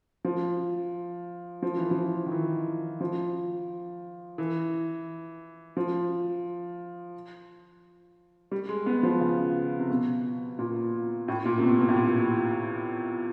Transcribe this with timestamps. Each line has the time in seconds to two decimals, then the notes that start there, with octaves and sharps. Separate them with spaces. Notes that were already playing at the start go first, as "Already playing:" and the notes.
0.25 F3
1.62 F3
1.77 E3
1.91 F3
2.26 D#3
2.31 E3
3.00 F3
4.38 E3
5.77 F3
8.51 G3
8.69 G#3
8.86 B3
9.03 F3
9.20 C#3
9.79 C3
9.90 B2
10.59 A#2
11.28 A2
11.45 A#2
11.58 C3
11.63 B2
11.79 B2
11.89 A2
11.96 A#2